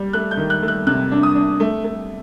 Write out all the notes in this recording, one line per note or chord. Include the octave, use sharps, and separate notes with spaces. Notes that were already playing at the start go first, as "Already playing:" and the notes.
Already playing: G3
A3 F#6
G6
D#3
F#6
A3
F#6
C3 F#6
D4
D#6
D4
A3
A3